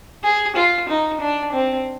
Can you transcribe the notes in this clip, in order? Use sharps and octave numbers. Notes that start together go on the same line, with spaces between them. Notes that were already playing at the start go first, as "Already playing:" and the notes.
G#4
F4
D#4
D4
C4